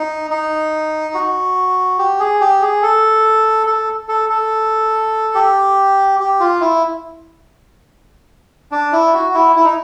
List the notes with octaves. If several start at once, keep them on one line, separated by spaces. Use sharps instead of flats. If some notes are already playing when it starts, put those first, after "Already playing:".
Already playing: D#4
D#4
F#4
G4
G#4
G4
G#4
A4
A4
A4
A4
G4
G4
F4
E4
D4
E4
F#4
E4
E4
D#4